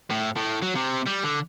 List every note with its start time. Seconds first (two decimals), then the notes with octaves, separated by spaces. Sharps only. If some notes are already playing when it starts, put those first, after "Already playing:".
0.10 A2
0.36 A2
0.62 F#3
0.75 C3
1.06 G3
1.24 D3